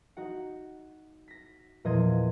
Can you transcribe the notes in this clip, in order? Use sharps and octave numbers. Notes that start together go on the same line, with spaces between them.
D#4 F#4 F#5
A#6 B6
E2 A#2 F3 D#5 C6 G#6